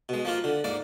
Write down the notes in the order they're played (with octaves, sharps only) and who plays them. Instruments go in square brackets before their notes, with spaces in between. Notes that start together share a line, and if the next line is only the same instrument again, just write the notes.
[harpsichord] B2 G#3
F3 A#3 F4
D3
G#2 A#3 D5